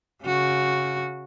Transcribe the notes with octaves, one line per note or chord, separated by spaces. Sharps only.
C#3 F#4